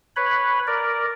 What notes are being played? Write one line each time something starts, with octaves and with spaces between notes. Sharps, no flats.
B4 C#5 B5
A#4 D5